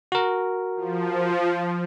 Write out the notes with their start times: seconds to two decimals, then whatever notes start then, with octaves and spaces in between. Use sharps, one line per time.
0.12 F#4 A#4
0.76 F3